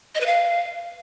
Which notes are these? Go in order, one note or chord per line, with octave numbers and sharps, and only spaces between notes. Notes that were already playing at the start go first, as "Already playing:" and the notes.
D#5
B4
F5